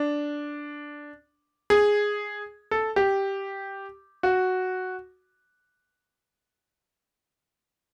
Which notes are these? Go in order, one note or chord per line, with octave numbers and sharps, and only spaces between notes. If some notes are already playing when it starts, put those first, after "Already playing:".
Already playing: D4
G#4
A4
G4
F#4